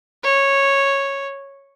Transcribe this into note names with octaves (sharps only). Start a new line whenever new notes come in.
C#5